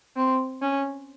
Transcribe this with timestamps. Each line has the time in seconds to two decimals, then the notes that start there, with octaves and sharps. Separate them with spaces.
0.17 C4
0.62 C#4